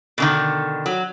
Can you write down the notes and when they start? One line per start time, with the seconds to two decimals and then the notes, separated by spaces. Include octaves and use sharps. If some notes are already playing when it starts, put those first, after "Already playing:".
0.18 B2 D3 D#3
0.86 F#3